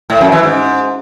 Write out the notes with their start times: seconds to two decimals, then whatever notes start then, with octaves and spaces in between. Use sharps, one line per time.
0.10 A2
0.21 F#2
0.32 E3
0.43 G#2